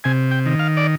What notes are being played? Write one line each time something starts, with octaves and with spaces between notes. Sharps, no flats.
C3 G#5
G5
D#3
F5
D5